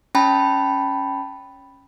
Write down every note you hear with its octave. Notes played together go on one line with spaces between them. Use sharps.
C#4 G5 A5 B5